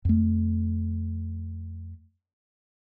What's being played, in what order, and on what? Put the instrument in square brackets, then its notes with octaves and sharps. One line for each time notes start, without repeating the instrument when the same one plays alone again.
[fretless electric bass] F2 A3